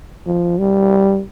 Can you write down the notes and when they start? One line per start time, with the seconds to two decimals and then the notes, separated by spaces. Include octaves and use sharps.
0.26 F3
0.58 G3